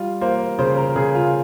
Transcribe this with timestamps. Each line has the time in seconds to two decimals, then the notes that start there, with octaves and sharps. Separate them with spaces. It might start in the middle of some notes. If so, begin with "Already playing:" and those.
Already playing: G3 F4
0.21 A#3 C5
0.59 C#3 C5
0.77 A#4
0.96 C#3 G#4
1.15 F4